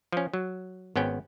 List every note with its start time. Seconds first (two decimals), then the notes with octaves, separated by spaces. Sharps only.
0.12 F3 C#4
0.34 F#3
0.96 G#1 B3 C#4 G5